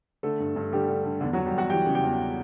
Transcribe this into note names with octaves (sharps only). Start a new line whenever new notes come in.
D3 A3 A4
G2
G2
D3 G3 G4
D3
D3
E2 D3 D4
F#3 F#4
E2
G3 G4
E2 F#4 F#5
E3 G4 G5
C#3
G4 G5
E2